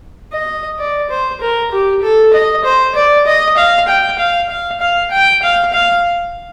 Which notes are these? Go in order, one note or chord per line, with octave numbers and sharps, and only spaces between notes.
D#5
D5
C5
A#4
G4
A4
D#5
C5
D5
D#5
F5
G5
F5
F5
F5
G5
F5
F5